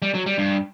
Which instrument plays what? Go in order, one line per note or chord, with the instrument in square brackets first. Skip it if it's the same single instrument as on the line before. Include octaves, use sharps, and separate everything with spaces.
[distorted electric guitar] G3
F#3
G3
G2